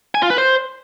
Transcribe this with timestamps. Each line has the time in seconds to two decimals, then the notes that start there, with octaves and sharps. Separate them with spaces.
0.15 G#5
0.22 F4
0.30 B4
0.38 C5